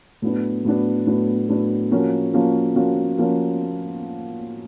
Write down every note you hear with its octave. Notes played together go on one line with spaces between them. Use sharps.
A2 F#3 B3 D4
A2 F#3 B3 D4
A2 F#3 B3 D4
A2 F#3 B3 D4
F3 A#3 C#4 F#4
F3 A#3 C#4 F#4
F3 A#3 C#4 F#4
F3 A#3 C#4 F#4